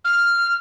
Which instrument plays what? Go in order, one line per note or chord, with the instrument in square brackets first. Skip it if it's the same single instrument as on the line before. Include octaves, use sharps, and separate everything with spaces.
[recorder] F6